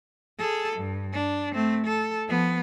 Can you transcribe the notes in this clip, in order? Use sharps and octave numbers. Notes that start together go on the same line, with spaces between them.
G#4 A4
G2
D4
A3 C4
A4
F3 B3